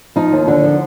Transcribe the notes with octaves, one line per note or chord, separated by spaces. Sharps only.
F3 D#4
D#2
D3
F3